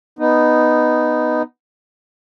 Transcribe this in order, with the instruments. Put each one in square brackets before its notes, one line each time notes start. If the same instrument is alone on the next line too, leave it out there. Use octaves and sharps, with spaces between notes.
[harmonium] B3 D#4